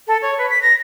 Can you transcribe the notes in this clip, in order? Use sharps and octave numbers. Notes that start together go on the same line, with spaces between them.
A4
C#5
B4
B6
A#6